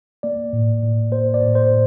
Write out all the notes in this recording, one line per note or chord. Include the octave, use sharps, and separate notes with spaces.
A#3 D5
A2
A2
A#3 C5
D5
A2
C5
A2